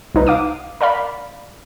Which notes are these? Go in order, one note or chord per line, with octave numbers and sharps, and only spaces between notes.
C2 D#4 B4
F5 D6 D#6
A#4 D5 F5 B5